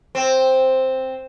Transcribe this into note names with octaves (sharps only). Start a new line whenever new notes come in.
C4